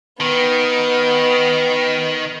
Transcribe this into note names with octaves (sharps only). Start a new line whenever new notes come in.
D#3 B3